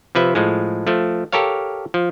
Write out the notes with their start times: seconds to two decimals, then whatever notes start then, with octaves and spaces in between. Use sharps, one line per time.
0.15 C3 F3 B4 E5
0.35 A2 F3 G#3
0.87 F3 A3
1.32 G4 A4 A#4 C#5 F5
1.94 F3